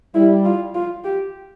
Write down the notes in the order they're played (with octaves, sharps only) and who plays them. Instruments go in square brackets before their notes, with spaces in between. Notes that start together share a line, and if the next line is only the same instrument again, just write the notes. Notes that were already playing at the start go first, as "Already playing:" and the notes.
[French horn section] G3 [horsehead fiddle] E4
[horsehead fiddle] F4
F4
G4